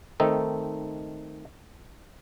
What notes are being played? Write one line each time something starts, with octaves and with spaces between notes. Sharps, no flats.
D#3 A3 C4 D#4 A4